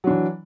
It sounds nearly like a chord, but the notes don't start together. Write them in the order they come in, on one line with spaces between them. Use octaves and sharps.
F#3 D4 E3